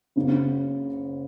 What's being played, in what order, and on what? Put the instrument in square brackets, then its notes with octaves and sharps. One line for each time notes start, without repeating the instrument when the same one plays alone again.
[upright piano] F#1 F#2 C#3